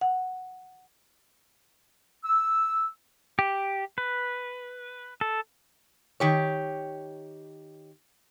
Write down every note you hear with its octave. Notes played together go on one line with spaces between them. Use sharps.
F#5
E6
G4
B4
A4
D#3 G4 C#5